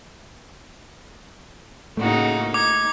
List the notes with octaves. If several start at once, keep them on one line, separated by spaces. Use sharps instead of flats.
A2 C#3 A3 A#3 D#4 F#4
D#4 D6 G#6